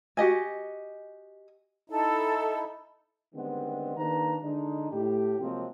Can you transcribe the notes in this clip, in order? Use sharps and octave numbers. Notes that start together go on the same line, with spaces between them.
F#4 G4 D#5 G#5
D#4 E4 A4
D3 D#3 G3 G#3 B3 C4
D#3 A#3 D4 G#4 B4 A#5
D3 G#3 D4 D#4
A2 G4
C3 F3 F#3 G#3 A#3 C4